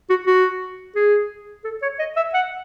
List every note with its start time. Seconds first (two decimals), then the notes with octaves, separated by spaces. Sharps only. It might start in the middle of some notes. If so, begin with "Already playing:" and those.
0.10 F#4
0.26 F#4
0.96 G#4
1.64 A4
1.82 C#5
1.99 D#5
2.16 E5
2.34 F#5